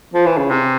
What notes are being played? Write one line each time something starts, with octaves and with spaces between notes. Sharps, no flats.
F3
E3
C#3
C3